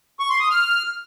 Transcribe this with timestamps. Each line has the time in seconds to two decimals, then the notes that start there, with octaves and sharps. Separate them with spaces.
0.19 C#6
0.30 C6
0.40 D#6
0.50 F6